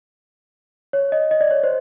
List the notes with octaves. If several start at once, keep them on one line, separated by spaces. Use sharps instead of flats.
C#5
D#5
D#5
D5
C#5
C5